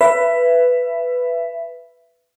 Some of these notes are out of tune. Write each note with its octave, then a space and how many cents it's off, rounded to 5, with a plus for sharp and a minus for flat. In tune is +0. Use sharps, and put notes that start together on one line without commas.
B4 +5 E5 +25